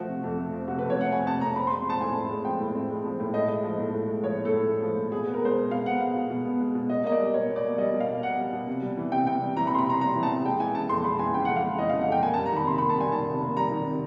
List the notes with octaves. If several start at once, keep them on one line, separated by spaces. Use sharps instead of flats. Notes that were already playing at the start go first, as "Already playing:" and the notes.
Already playing: F3 A3 F#4
C3
F2
A3
F3
C3 F#4
F2 B4
C#5
A3 F#5
F3 G#5
C3 A5
F2 A#5
C4 B5
G#3 C6
F3 A5
A2 G#5
C4
G#3
F3 G5
A2
C4
G#3
F3
A2
A2 D#5
G#3 D#5
F3
A2
A2
G#3
F3 C#5
A2
A4
A2
G#3
F3
A2
B2 G#4
B3
A#4
G#3 C5
B2
B2 F5
B3 F#5
G#3 F5
B2
B2
B3
G#3
B2
B2 D#5
A#3 D#5
D5
G3
B2 C#5
B2
D5
A#3
G3 D#5
B2
F5
B2
A#3 F#5
G3
B2
C3
G3
E3
C3 G5
C3 G5
G3
E3 A#5
B5
C3 C6
B5
C3 A#5
G3 A#5
E3
A5
C3
G#3 G5
E3 G#5
C#3 A5
F2 C6
G#3 B5
E3 G#5
C#3 G5
F2 F#5
F5
G#3
E3 D#5
C#3 F5
F#5
F2 G5
A#3 G#5
G3 A5
A#5
D#3 B5
C3 C6
A#3 B5
A5
G3 G#5
D#3 A5
C3
A#3
G3 A#5
D#3
C3